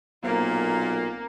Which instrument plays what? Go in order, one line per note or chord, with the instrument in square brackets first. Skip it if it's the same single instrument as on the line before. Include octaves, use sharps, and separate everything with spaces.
[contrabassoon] B1 [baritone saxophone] A#2 [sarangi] A#3 [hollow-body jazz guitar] C4